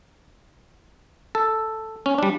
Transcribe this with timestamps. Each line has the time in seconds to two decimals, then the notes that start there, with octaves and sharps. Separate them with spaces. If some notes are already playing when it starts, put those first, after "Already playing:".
1.35 A4
2.06 C#4
2.18 G3 D4